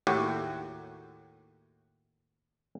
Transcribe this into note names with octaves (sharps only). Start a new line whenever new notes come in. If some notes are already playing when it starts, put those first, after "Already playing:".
D#2 A2 F#4 G4 F#5